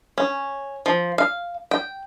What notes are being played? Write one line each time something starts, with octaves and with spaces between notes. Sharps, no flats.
C#4
F3
F5
G5